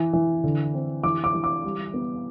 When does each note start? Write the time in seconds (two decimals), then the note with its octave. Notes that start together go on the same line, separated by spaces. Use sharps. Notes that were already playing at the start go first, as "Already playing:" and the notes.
Already playing: E3
0.13 E3
0.44 D3
0.74 C4
1.04 E3 D6
1.24 D6
1.34 E3
1.44 D6
1.64 G3
1.94 B3